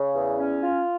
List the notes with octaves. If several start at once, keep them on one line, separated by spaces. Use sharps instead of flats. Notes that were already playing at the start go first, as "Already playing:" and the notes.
Already playing: C#3
E2
C#4
F4